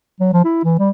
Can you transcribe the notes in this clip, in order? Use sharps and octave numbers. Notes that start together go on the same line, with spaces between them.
F#3
F3
E4
E3
G3